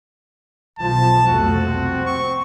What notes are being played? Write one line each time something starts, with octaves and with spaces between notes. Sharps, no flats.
B1 F3 A5
C2 F2 A3 F#4
C4
C#6